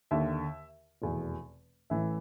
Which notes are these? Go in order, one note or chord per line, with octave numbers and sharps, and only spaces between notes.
D#2 D3 E5
F1 E2 B2
A1 A2 E3 E5